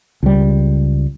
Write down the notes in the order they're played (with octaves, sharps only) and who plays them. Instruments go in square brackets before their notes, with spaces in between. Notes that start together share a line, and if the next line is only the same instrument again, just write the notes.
[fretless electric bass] C#2 G3